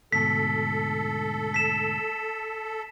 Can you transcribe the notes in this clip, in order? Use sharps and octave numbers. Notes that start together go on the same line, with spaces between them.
D2 G#2 B2 A4 B6
B6 E7